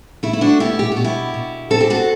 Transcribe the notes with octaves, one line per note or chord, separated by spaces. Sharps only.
A3 E4
E4
D4 F#4
B2 E4 G4
G4
F#4
B2
E4 G4
B2
C4 A4
G4
F#4 A4